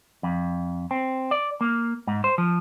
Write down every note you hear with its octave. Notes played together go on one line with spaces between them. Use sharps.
F2
C4
D5
A#3
G#2
C5
F3